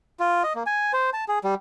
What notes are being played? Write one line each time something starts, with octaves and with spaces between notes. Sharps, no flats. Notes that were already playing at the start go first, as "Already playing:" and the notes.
F4
D#5
A#3
G#5
C5
A5
G#4
G3